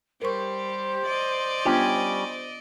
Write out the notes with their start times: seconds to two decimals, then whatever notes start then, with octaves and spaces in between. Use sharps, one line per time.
0.22 G3 G4 A#4 C5 C#6
1.07 D5 D#5
1.65 G3 B3 C#4 D4 F4 G4